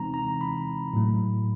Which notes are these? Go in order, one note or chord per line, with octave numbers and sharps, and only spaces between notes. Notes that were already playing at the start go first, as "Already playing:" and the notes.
Already playing: C3 E3 G#3 C4 D#4 A#5
A#5
B5
A2 F#3 A3